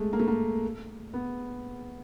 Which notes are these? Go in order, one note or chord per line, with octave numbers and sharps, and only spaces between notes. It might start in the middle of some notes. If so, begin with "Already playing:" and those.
Already playing: G#3 A3
A#3
A3
A#3
B3